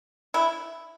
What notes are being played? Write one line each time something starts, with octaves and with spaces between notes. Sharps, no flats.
E4